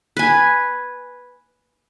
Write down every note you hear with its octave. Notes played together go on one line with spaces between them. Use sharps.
B4 G#5